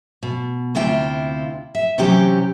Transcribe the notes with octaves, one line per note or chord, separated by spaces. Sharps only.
B2
D2 C3 E4 F4 G5
E5
C3 E3 F#3 C#4 G4 G5